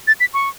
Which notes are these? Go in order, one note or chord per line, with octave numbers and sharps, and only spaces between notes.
A6
B6
C#6